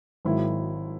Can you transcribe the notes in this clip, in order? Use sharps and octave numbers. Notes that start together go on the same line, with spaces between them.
G#1 G#2 D#3 F#3 E4